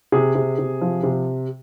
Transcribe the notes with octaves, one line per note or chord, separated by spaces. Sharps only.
C3 G#4
C3
C3
F3
C3